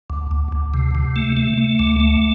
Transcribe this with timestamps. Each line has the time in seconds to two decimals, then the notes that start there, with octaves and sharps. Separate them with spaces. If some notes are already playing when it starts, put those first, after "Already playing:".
0.10 D2
0.31 D2
0.52 D2
0.74 C3
0.95 C3
1.16 A3
1.37 A3
1.57 A3
1.79 D2
2.00 A3